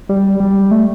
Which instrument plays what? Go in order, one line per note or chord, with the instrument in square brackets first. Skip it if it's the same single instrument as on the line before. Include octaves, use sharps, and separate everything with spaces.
[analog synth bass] G3
G3
A3